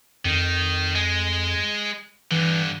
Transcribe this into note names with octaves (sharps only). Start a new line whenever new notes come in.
F2 D#3
G#3
G2 D3 E3